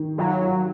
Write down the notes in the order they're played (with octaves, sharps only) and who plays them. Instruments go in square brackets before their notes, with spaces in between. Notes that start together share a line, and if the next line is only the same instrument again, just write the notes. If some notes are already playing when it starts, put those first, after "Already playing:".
Already playing: [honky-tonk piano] D#3
[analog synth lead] F#3 [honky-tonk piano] F4
[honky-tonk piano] F4